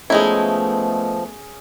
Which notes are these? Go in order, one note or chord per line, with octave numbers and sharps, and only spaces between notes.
F3 G#3 A3 B3 C#4 D#4 E4 G#4